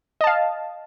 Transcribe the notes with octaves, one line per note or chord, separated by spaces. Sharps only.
D#5 F5 A5